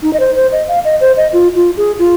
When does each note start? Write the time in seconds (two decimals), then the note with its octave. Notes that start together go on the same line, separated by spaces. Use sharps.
0.03 D#4
0.13 D#5
0.20 C5
0.36 C5
0.52 D#5
0.68 F5
0.85 D#5
1.01 C5
1.17 D#5
1.33 F4
1.55 F4
1.77 G#4
1.99 F4